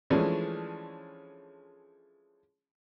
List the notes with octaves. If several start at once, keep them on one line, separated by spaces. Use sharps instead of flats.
E3 F3 G#3 A3 C#4 D4